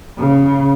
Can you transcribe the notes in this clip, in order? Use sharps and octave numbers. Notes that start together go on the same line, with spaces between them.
C#3